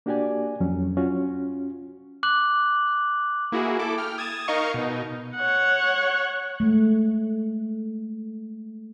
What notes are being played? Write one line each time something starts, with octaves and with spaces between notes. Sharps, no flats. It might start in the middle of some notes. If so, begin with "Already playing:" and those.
A#3 D4 F#4 G4 D5 G#5
F2 F#3 C#4
C#4 F4 F#4
D6 F#6 F#7
A#3 E4 F#4 G#4
E4 A4 D6
G5 F6
D#6 G#6 A6 E7
D#4 A#4 D#5 F5 C#6
B2 D#4
C#5 F#5
G#3 A3